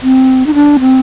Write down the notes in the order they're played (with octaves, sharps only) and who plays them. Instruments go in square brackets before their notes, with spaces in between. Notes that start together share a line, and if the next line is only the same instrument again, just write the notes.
[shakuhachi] C4
D#4
D4
C4